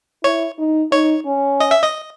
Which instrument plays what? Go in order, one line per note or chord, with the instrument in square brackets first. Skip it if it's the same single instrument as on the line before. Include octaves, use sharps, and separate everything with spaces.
[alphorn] E4 [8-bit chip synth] C#5
[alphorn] D#4
[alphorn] D#4 [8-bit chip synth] C#5
[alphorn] C#4
[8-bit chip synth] D#5
E5
D#5